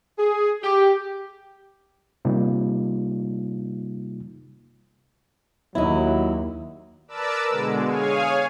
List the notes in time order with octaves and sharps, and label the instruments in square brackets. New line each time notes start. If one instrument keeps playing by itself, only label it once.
[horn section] G#4
G4
[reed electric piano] C3 G3 A#3 D#4 F4
[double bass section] D#2 [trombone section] F#3 [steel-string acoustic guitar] D#4 E4
[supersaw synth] A#4 B4 D5 A5 D6 E6
B2 D3 G#3
G#4 C#5 F5 G#5